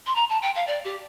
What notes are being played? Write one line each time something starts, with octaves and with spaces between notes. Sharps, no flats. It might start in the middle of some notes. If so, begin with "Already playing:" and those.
C6
A#5
A5
G5
F5
D5
G4